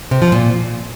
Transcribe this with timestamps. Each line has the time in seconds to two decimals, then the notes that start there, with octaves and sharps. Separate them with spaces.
0.11 C3
0.22 F3
0.32 A#2